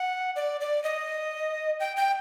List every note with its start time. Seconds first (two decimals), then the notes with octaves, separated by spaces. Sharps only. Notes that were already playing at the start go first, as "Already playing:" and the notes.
Already playing: F#5
0.36 D5
0.61 D5
0.84 D#5
1.80 G5
1.97 G5